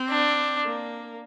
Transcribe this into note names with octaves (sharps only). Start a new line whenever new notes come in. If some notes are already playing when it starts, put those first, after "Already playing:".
Already playing: C4
D4
A#3